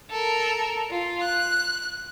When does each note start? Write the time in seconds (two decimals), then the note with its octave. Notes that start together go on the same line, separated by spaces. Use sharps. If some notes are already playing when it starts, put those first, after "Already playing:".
0.10 A4 A#4
0.90 F4
1.22 F#6